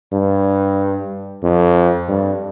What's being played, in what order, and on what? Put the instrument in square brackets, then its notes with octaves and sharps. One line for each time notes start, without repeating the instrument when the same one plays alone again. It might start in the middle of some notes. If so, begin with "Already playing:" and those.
[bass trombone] G2
F2
G2